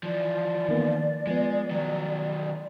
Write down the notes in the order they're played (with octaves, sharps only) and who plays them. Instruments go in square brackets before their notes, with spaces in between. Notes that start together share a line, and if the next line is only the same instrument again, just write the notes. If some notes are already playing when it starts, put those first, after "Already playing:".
[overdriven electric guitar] E3 F3 [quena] D5
[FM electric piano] D#3 A#3 B3
[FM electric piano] F3 B3 [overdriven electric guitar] G#3
[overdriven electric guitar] D#3 F#3